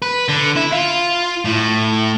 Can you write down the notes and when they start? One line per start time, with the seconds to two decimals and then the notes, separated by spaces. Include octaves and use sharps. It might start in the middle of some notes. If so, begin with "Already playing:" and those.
0.02 B4
0.28 D3
0.56 E4
0.72 F4
1.45 A2